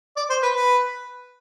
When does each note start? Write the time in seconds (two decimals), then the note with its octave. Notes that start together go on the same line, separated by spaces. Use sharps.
0.16 D5
0.30 C5
0.42 B4
0.55 B4